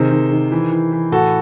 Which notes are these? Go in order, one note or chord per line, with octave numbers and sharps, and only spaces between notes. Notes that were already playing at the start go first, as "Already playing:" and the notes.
Already playing: C3 D#3 G#4 C5
D#3
D#3
E3
E3
E3
A2 F#4 A4